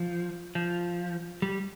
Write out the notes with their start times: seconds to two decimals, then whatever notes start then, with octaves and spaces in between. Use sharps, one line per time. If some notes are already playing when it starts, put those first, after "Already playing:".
Already playing: F3
0.55 F3
1.42 G3